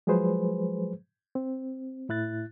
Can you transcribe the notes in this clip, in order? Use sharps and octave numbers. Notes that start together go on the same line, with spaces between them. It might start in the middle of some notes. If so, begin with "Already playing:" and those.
F3 F#3 G#3 G#4 B4 C5
C4
A2 E4 F#6 A6